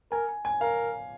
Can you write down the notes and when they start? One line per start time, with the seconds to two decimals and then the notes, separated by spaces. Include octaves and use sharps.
0.11 A#4 G#5
0.45 G#5
0.61 A#4 F5